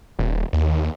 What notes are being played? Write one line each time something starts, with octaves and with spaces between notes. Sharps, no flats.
D#1
D#2